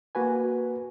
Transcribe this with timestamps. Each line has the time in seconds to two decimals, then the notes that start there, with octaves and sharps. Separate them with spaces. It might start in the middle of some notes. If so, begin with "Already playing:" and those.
0.15 A#3 F#4 B4 G#5